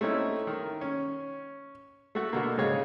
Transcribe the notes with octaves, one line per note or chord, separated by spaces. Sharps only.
A3 C4 C#4 D#4 E4
D#3
C#4
A3 F#4
B2 D3 A#3
G#2 C#3 G#4 C#5 D#5 F5